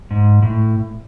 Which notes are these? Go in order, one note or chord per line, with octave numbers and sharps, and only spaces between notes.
G#2
A2